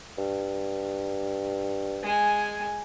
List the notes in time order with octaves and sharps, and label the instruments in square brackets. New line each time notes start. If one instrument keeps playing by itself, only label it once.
[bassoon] G2
[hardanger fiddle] G#3 G#5